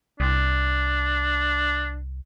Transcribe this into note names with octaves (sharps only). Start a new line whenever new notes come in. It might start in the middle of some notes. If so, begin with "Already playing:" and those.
C2 D4